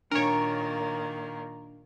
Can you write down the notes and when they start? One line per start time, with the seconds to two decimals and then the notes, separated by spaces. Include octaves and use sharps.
0.11 A#2 D#3 A#3 D4 A#4 C#5 D7